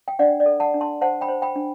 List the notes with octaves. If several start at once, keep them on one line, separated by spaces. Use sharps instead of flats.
G5
D4 D5 F#5
D5
A4
F#5 A5
D4
A5 C6
C5 F#5 A5
G5 B5
C5
G5 B5
D4